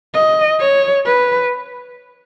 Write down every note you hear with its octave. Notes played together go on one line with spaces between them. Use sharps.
D#5
C#5
B4